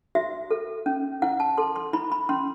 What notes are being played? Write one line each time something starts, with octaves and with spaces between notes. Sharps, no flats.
F#4 E5
A4
C#4
E4 F#5
A5
A4 C6
C6
E4 B5
B5
C#4 C6